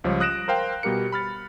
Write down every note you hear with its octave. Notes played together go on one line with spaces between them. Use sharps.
C#2 F3 G3 C#5
D#6 F#6 A#6 D7 E7
A#4 C5 F5 G5
B2 G3 G4 A#4 C#7
B5 F6 A6